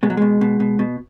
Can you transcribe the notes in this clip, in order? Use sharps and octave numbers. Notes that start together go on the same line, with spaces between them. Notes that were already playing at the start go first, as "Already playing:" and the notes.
B2 G#3
F#3
B2 G#3
B2
B2
B2